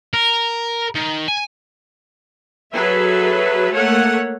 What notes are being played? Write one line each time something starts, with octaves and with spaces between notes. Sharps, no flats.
A#4
D#3
G#5
F#3 G#4 A4 B4 E5
A3 A#3 C#5 F#5